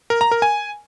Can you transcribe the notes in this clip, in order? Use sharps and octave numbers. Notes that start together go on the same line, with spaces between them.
A#4
A#5
A#4
G#5